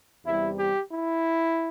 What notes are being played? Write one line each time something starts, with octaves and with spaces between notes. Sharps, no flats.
E2 C3 G3 E4
G4
E4